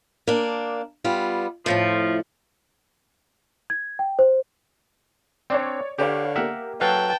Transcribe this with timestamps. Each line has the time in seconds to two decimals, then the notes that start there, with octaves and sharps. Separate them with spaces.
0.27 A#3 D4
1.04 G3 B3 F4
1.66 F2 A2 F3 A3
3.70 G#6
3.99 G5
4.19 C5
5.50 C4 D4 C#5 D5
5.98 D3 G4 B4 C#5 F5
6.36 A#3 G4 A#4 E5 F#5
6.81 F#3 A4 B4 F5 G5 A5